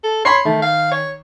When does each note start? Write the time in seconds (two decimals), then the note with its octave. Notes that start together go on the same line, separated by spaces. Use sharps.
0.04 A4
0.25 C#5 B5 C6 C7
0.45 D#3 A3
0.62 F5
0.91 C#5